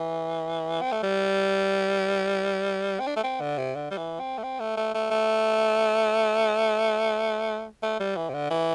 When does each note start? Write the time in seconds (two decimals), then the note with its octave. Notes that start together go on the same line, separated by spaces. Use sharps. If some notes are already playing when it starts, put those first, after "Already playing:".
Already playing: E3
0.82 C4
0.92 A3
1.03 G3
3.00 C4
3.07 D4
3.17 A3
3.24 C4
3.41 D3
3.58 C3
3.75 D3
3.91 G3
3.98 E3
4.20 C4
4.38 A3
4.43 C4
4.60 A3
4.77 A3
4.94 A3
5.11 A3
7.83 A3
8.00 G3
8.17 E3
8.30 C3
8.34 D3
8.51 E3